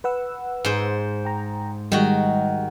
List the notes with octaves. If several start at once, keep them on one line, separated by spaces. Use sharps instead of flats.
B4 F#5 E6
G#2 C5
G5 A#5
D#3 G3 G#3 F#4